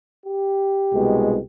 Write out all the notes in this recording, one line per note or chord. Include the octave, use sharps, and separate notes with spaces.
G4
C2 B2 G#3